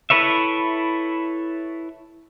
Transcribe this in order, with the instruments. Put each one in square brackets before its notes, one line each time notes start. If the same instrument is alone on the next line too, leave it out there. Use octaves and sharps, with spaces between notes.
[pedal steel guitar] E4 A4 B4 C#5 E5